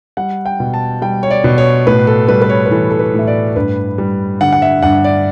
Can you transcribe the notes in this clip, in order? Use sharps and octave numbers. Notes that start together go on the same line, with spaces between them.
G3 F#5
G5
B2
A5
G3 G5
C#5
D5
B2
C#5
A2 B4
A4
G3 B4
B4
C#5
B4
E3 A4
A4
B4
A2 E5
D5
G2 B4
G3
D3 F#5
F#5
E5
G2 F#5
D5